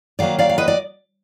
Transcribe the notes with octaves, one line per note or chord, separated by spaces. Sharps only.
D#3 F#3 A#3 D5 F5
D5 F5
F5
B4 D#5
D5